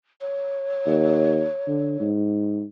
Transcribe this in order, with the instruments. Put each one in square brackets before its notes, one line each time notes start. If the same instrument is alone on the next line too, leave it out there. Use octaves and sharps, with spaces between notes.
[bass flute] C#5
[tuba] D#2
D3
G#2